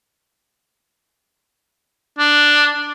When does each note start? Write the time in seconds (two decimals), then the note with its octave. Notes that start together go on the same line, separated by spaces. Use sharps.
2.18 D4